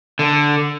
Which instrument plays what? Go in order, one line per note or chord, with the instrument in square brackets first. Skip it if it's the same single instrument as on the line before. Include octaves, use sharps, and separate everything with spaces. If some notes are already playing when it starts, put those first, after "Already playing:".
[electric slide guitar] D3